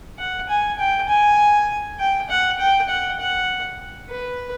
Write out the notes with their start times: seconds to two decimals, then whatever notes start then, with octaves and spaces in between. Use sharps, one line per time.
0.19 F#5
0.49 G#5
0.79 G5
1.09 G#5
1.99 G5
2.29 F#5
2.59 G5
2.89 F#5
3.20 F#5
4.09 B4